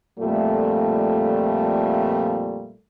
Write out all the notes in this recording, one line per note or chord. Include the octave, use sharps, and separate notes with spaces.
F2 A#2 G3 A3